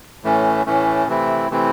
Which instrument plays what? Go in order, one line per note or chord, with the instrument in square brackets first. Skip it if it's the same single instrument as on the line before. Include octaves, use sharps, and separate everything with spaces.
[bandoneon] A2 E3 A3 C#4
A2 E3 A3 C#4
C3 E3 A3 C4 E4
C3 E3 A3 C4 E4